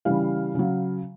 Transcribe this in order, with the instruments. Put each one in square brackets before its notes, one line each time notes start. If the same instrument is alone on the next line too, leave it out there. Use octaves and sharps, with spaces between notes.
[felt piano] C#3 E3 G3 F5
C#3 F#3